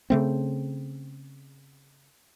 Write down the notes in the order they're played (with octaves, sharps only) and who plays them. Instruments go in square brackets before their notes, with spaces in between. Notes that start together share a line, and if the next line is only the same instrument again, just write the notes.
[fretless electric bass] C#3 A3 C4